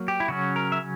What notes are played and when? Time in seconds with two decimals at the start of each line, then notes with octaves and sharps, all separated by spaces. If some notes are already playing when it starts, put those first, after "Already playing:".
Already playing: F#3 A#3
0.08 G4
0.20 E4
0.28 C#3 F#3 C#4 F#4
0.56 A#4
0.72 E5